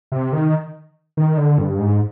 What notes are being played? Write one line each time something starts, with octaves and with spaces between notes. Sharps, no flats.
C3
D#3
D#3
D3
G2
G#2